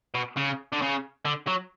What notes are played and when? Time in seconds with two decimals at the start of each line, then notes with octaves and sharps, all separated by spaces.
0.15 B2
0.37 C#3
0.72 D3
0.82 C#3
1.25 D3
1.47 F#3